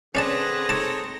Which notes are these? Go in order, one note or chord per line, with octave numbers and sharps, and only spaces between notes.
D3 C4 C#4 G#4 B4 D5 A5 A#6
D#4 A4 C#5 A5 D6